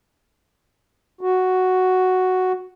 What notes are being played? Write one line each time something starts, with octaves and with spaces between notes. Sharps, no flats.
F#4